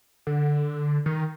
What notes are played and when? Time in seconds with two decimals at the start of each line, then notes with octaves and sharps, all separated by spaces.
0.27 D3
1.06 D#3